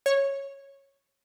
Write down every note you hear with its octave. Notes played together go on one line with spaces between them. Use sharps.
C#5